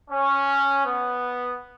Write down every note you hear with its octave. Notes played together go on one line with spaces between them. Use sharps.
C#4
B3